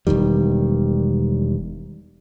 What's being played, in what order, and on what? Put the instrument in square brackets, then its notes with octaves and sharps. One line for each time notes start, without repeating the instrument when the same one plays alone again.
[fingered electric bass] E1 D#2 D#3 G3